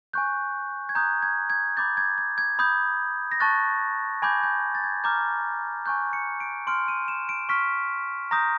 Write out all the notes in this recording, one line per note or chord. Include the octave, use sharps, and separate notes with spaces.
G#5 C#6 F#6 G6
G#6
A#5 D#6 F#6 G6
G#6
G#6
B5 D6 G6 A6
G#6
G#6
G#6
B5 D#6 G6
A#6
A5 C#6 F#6 A6
G#5 B5 D6 G6 G#6
G6
A6
G#6
A#5 D6 F6 G6
G#5 C#6 F#6 G6
C#7
D7
C6 F6 D7
D#7
E7
D7
C#6 F6 B6
A#5 D#6 G6 A#6